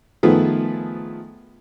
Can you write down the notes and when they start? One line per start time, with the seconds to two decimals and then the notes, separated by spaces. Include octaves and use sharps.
0.23 D#3 F3 A3 B3 G#4